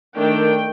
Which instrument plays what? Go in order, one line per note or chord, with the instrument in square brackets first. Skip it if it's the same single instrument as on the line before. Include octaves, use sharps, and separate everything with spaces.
[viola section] D#3 A3 D4 G5